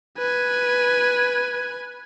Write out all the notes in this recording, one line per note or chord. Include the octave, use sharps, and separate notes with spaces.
B4 G#5